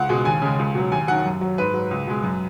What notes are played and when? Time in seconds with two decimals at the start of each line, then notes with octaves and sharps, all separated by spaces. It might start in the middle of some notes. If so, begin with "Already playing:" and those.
Already playing: C#2 F#5
0.09 B2 G#3
0.25 D#2 G#5
0.42 C#3 G#3
0.59 C#2
0.75 B2 F#3
0.92 D#2 G#5
1.08 D#3 F#3 F#5
1.25 F#2
1.41 F#3
1.58 G#2 B4
1.74 F#3
1.91 C#2
2.07 B2 G#3
2.23 F#2